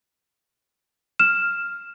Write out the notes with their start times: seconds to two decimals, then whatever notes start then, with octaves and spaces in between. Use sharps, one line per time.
1.19 F6 E7